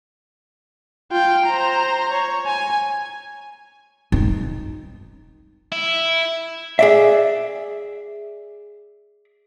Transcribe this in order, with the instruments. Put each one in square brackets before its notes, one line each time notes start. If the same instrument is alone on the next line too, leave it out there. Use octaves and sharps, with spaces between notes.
[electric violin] F4 G5
C5 A#5
C#5
G#5
[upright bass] D#4
[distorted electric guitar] E4
[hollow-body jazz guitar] G#4 D5 E5